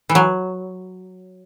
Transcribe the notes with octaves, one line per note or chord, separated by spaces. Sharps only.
E3
F#3